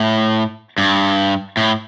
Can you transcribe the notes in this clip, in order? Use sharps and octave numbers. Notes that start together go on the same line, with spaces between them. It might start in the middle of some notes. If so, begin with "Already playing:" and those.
Already playing: A2
G2
A2